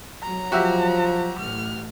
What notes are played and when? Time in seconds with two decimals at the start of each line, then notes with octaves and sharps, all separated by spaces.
0.23 F#3 A#5
0.52 F3 F#4 G4 E5
1.39 A1 F6